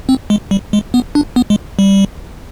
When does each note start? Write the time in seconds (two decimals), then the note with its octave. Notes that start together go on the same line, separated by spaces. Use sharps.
0.09 C4
0.30 G#3
0.51 G3
0.73 G#3
0.94 B3
1.15 D4
1.36 B3
1.50 G#3
1.79 G3